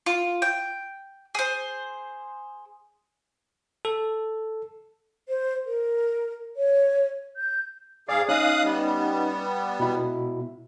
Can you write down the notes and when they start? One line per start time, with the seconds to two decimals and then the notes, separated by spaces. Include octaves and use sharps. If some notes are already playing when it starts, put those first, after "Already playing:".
0.06 F4
0.42 G5
1.35 G#4 C5
3.85 A4
5.29 C5
5.66 A#4
6.56 C#5
7.37 G6
8.09 G#2 G#4 D5 F5
8.29 C#4 D#4 D#5 F5 D#6 F#6
8.63 G3 B3
9.80 B2 E4